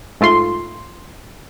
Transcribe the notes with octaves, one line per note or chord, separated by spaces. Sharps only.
G#2 A3 F4 C6